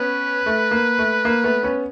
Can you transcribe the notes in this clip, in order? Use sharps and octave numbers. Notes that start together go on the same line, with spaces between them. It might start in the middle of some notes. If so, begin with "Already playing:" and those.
Already playing: B3 C#4 B4
A3
A#3
A3
A#3
A3 B3
B3 C#4